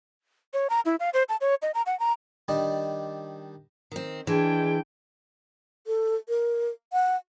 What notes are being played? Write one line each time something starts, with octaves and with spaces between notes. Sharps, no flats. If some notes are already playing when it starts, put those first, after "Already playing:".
C#5
A#5
E4
F5
C5
A5
C#5
D#5
A#5
F#5
A#5
D#3 G3 D4 D#5
D#3 C4
E3 G#3 D4 G5
A4
A#4
F#5